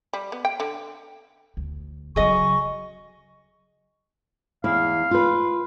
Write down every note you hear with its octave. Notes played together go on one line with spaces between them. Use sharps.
G3
B3
G5
D3
D2
C#3 F#3 G#4 D#5 C#6
E2 E4 F5
F4 B4